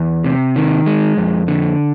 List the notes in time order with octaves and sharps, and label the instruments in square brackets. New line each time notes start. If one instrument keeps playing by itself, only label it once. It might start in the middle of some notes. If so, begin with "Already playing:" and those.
Already playing: [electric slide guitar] E2
C3
D#3
G#3
F2
D3